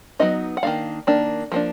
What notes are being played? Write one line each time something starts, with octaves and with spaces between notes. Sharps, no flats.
F#3 B3 D#4 D#5
F#5
D#3 A#3 D4 F5
D#3 A#3 D4
F3 A#3 D4